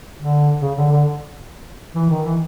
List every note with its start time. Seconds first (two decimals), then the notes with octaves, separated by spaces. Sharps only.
0.18 D3
0.61 C#3
0.77 D3
0.92 D3
1.95 E3
2.10 D#3
2.25 E3